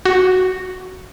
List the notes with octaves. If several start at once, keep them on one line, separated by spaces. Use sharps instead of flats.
F#4